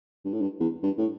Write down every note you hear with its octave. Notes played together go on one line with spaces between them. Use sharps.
G2
A2
G2
E2
G2
A2